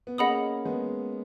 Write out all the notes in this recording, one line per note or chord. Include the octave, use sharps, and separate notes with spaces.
B3
A#3 C#4 G#4 D#5 F#5 B5 D#6
G#3 B3